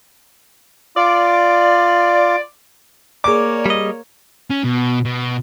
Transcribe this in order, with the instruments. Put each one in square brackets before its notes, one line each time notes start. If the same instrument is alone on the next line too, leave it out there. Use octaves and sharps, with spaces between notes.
[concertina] F4 [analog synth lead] D5
[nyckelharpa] A#3 C#5 [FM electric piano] G#4 D5 [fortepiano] D6
[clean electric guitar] G3 D#5
[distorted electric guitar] C#4
B2
B2